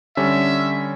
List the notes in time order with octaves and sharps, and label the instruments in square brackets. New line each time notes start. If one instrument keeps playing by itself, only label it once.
[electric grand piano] D3 G3 C#4 [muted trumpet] E5